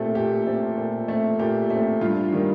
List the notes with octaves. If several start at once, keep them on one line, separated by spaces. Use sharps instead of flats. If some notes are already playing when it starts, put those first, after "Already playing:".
Already playing: A#2 A3 C4 G4 A4
A#2 G4
A3 C4
A#2
A3 C4
A#2 G4
A3 C4
G2 F4
D#3 G3